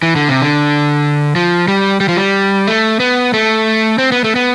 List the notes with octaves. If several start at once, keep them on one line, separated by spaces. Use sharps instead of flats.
E3
D3
C3
D3
F3
G3
G3
F3
G3
A3
B3
A3
C4
B3
A3
B3